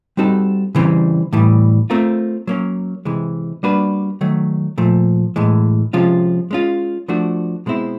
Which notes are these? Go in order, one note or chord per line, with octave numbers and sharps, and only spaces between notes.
G3 C4 D#4 F#4 A4
C#3 E3 G3 C4
A2 E3 G3
A3 C4 F4 A#4
F#3 A#3 C#4
C3 E3 G#3
G3 A#3 D4 F#4 B4
D#3 F#3 A3
A#2 F3 A3
A2 E3 G#3
C3 F3 G#3 C#4 F4
G#3 C#4 F4
F3 A3 D4 F#4
B2 G#3 C4 E4